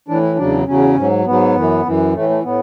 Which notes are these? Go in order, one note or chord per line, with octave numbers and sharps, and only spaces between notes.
A2 E3 D4
E4
E2 C#3 F#3 D4
E2 C#3 F#3 C#4
G#2 F#3
G#2 F#3 B3
F#2 E3
F#2 E3
A2 E3 A3
A3
A2 B3